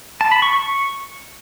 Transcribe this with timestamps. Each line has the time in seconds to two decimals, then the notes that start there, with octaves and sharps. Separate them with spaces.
0.21 A5
0.32 B5
0.42 C#6
0.53 C#6